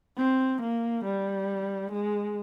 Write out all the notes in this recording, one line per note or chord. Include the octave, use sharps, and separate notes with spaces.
C4
A#3
G3
G#3